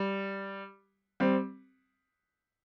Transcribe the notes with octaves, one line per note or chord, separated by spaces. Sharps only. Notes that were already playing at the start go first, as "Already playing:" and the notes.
Already playing: G3
G3 C4